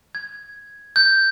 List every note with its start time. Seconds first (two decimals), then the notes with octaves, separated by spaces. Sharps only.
0.15 G#6
0.96 G6